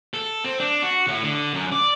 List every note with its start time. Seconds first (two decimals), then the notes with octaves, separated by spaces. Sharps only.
0.14 A4
0.44 C4
0.60 D4
0.83 F#4
1.07 A2
1.23 D3
1.54 F#2
1.72 D5